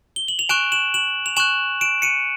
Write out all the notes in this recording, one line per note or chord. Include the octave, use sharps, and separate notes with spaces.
G7
F#7
F7
G#5 C#6 F#6 D7 E7
E7 F#7
E7 F#7
F7
G#5 C#6 F#6 E7 F#7
D7 E7
C#7 D#7